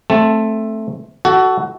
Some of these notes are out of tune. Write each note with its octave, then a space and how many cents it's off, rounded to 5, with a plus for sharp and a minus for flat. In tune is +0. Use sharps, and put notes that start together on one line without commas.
A3 +0 C4 +20 A5 +0
F#4 +20 A4 +0